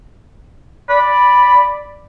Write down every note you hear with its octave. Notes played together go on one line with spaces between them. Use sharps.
D5 B5